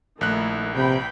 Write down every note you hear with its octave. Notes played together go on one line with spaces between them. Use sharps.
A#1 D#3 A3 E4 F#6
C3 B4 G5 B5